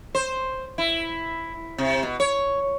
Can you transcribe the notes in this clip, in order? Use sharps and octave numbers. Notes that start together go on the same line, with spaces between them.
C5
E4
C3
B2
C#5